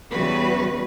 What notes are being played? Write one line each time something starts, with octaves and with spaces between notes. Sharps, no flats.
E2 C#3 G3 F#4 B4